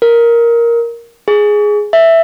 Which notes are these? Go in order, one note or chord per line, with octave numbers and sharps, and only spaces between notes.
A#4
G#4
E5